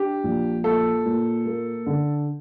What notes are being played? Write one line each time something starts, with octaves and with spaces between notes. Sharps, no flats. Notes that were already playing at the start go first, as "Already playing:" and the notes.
Already playing: D4 G4
A#1
A#2 A4
A#2
A#3
D3